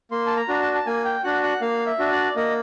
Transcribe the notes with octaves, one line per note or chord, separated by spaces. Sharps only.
A#3 C6
A5
A#5
D4 F#4
A5
A5
A#3 G#5
G5
D4 F#4 F#5
F#5
A#3 F5
E5
D4 F#4
D5
A#3 D#5